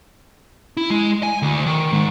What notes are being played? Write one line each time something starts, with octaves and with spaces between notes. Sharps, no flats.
E4
G#3
G#5
D2
D#3
G#2